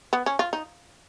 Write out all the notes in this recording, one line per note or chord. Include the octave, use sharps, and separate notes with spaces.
B3
C#4
F4
D#4